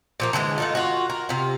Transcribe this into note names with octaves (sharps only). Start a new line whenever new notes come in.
A#2 F3 A#3
D3 E3 G3 G#3
A3 D#4 F4
F4 F#4
A#4
C3 F4